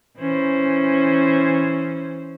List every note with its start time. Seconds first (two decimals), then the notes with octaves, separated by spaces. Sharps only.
0.18 E3 C#4 C5